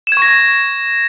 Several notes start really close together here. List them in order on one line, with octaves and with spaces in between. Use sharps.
E7 G#6 C#6 A#6